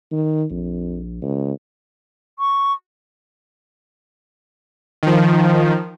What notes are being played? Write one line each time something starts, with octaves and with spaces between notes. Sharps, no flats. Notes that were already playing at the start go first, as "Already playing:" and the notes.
D#3
A#1 F2
C#2
C#6
D#3 F3